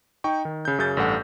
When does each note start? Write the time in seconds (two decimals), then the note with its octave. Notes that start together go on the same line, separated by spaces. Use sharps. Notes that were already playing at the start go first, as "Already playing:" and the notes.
0.24 D#4 G5 C#6
0.45 D#3
0.65 C#3 G6
0.78 F#2 C#3 G6 A6
0.97 A1 G2 A4 F#5